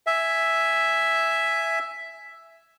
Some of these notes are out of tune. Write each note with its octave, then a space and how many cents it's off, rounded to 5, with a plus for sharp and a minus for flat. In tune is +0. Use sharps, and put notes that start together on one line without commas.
E5 +0 G#5 +0